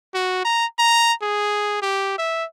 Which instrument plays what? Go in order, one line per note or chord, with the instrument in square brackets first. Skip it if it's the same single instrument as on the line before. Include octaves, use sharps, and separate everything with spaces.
[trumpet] F#4
A#5
A#5
G#4
G4
E5